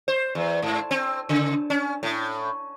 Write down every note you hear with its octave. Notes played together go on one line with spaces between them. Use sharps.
C5
E2
G#2
C4
C#3
C#4
A2